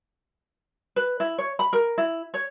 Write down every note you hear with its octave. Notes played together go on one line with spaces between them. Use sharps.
B4
E4
C#5
B5
A#4
E4
C#5